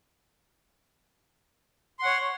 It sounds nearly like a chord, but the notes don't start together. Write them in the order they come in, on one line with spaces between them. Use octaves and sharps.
C6 F#5 C#5